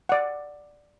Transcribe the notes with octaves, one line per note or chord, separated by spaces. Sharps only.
D5 F#5